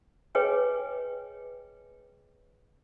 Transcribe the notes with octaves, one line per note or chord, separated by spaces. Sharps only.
G#4 B4 C#5 D#5 G5 G#5